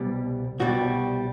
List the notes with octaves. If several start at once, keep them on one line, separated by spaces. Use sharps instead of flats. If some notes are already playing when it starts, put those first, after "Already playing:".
Already playing: C2 B2 G3
C2 B2 G3 F#4